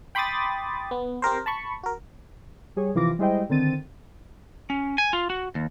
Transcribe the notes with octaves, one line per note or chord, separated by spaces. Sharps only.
G5 B5 C6 D6 D#6 A6
B3
C4 G4 A#4 C5
A5 B5 C#6
F#4 A#4
G3 G#4 C#5
C3 E3 F3 F4 D6 A#6
G3 G#3 E4 C5 D#5 G5
D3 D#3 C4 A6 D#7
C#4
G#5
F4
F#4
D#2